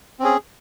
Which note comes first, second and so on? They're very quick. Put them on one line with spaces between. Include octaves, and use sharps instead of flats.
C4 C#4 G#4